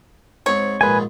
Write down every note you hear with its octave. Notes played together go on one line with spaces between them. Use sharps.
G#2 C4 C#5
A#1 D#2 G#2 B4 G#5